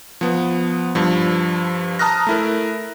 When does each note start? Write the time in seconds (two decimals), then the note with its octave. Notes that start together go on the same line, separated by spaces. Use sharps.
0.21 F3 B3
0.95 G2 F3
1.99 A5 A#5 D#6 F6 F#6 A#6
2.27 A3 E4 A#4